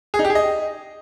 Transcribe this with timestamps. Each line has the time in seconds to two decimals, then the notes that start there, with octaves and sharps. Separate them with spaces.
0.14 G#4
0.19 D#4
0.25 G4
0.30 G#4
0.35 D#5